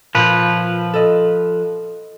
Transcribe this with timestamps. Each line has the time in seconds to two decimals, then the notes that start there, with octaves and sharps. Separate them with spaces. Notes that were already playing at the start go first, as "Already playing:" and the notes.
0.15 A#2 F3 B4 G6
0.94 A4 D#5